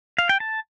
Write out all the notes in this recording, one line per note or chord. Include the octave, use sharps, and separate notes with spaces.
F5
G5
A5